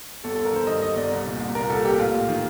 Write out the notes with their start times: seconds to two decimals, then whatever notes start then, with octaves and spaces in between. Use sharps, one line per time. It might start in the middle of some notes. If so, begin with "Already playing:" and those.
0.24 G1 A4
0.35 A4
0.39 G1
0.45 A#4
0.52 D#3 C5
0.67 G2 D#5
0.82 G1 D#5
0.96 G1 D5
1.12 C2
1.26 A#2
1.40 C2
1.55 A#2 A#4
1.69 C2 A4
1.85 A#2 G4
1.99 A1 F4
2.14 A1
2.28 D#3